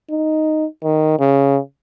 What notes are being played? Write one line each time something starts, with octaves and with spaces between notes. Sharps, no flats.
D#4
D#3
C#3